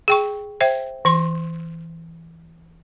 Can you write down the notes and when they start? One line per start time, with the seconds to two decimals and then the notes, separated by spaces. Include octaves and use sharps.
0.08 G#4 G5 C#6
0.61 C5 E5 G5
1.05 E3 C6